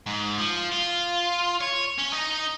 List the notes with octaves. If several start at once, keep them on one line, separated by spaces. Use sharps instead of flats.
G#2
F3
F4
C#5
C#4
D#4